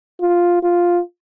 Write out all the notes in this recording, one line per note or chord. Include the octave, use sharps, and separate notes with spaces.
F4
F4